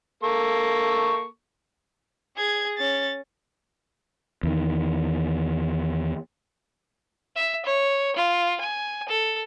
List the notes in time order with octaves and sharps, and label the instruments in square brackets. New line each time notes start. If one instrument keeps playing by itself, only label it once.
[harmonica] A#3 A4 C#6
[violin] G#4 G#6
C#4 A6
[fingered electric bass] E2 D#3
[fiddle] E5
C#5
F4
G#5
A4